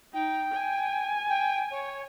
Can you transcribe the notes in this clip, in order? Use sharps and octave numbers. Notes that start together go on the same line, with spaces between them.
D#4 G5
G#5
G5
C#5